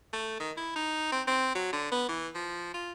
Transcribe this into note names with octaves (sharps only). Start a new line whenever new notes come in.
A3
D#3
E4
D#4
C4
C4
F#3
D3
B3
E3
F3
F4